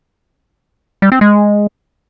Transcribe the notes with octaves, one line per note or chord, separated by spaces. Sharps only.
G3
C4
G#3